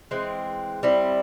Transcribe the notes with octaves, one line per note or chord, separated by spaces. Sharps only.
E3 G#3 C4
G3 C4 E4